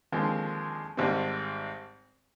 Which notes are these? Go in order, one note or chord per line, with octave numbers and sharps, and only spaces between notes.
D#2 D3 F3 G#3 C4
G#1 G#2 G3 C4